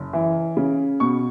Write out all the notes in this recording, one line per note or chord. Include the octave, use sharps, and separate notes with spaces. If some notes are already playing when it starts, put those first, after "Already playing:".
Already playing: F#1
E3
C#3
B2 C#6